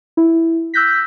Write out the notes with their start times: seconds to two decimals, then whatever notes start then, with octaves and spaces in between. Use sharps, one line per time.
0.17 E4
0.74 E6 F#6 G6 A#6 B6